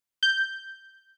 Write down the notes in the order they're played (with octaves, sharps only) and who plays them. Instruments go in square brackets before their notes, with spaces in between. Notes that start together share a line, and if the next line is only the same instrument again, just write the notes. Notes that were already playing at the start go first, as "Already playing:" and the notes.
[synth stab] G6